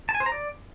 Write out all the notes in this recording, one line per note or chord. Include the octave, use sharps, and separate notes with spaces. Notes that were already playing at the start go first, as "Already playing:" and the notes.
A5
G#5
C5
A#5
D5